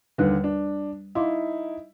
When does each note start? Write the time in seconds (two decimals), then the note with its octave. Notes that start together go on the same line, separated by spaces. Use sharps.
0.18 D#2 D3 G3 B4 F#6
0.44 D4
1.15 D#4 E4 F5 C6 D6